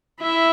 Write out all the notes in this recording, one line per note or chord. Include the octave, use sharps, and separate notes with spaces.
E4 E5